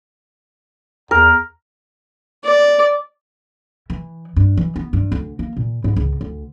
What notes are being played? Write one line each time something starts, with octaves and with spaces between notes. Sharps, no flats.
E2 A#4
D5
E3
G2
E3
B3
G2
D2
A#3
A#2
G#2
C#2
D2